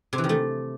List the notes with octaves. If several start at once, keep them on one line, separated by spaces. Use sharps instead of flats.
C3
E3
D#3
A3